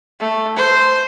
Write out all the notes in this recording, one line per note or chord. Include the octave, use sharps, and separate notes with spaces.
A3
C5